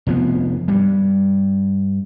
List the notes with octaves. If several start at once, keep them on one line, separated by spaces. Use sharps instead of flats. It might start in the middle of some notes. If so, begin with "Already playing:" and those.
F1 F3 B3
G2 G3